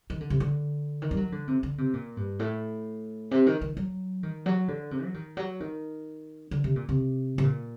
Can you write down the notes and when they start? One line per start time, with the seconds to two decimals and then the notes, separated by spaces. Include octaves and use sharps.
0.10 D#3
0.21 D3
0.30 C3
0.40 D3
1.02 D#3
1.11 G3
1.17 F#3
1.32 D3
1.47 C3
1.63 D3
1.78 C3
1.94 A#2
2.17 G2
2.39 A2
3.31 C3
3.47 D#3
3.61 D#3
3.77 F#3
4.23 D#3
4.46 F#3
4.68 D3
4.91 C3
5.04 F#3
5.14 D#3
5.37 F#3
5.60 D#3
6.51 D3
6.64 C3
6.76 A#2
6.89 C3
7.38 C3
7.43 A#2